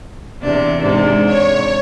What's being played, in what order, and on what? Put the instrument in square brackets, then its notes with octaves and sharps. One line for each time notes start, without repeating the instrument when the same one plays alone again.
[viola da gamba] E2 C3 D4
[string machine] G#2 [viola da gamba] C3 D4
[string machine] C#5